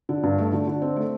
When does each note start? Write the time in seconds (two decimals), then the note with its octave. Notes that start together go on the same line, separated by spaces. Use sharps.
0.09 D3
0.23 G2
0.38 A3
0.53 D3
0.67 D3
0.82 C4
0.96 A3